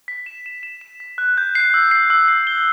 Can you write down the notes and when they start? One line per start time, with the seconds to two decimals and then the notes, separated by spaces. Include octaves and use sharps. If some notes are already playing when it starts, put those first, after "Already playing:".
0.08 B6
0.26 E7
0.46 E7
0.63 E7
0.81 E7
1.00 B6
1.18 F#6
1.38 G6
1.55 C7
1.74 E6
1.91 C7
2.10 E6
2.28 C7
2.47 G7